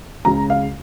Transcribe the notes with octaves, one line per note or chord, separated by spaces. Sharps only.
C#2 C#3 G#3 A#5
F5